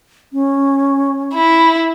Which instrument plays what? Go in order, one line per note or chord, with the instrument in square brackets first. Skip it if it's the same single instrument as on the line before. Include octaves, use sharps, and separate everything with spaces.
[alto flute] C#4
[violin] E4